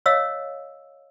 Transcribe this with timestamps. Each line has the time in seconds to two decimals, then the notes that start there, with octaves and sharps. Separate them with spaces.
0.06 C#5 D#5 F5 E6